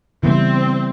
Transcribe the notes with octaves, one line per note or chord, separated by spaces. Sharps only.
C#3 E3 G3 B3 C4 E4